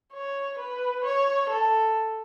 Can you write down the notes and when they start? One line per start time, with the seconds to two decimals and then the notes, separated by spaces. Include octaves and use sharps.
0.13 C#5
0.58 B4
1.04 C#5
1.50 A4